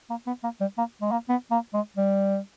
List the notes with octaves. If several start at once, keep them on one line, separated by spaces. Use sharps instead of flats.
A#3
B3
A#3
G3
A#3
G#3
A#3
B3
A#3
G#3
G3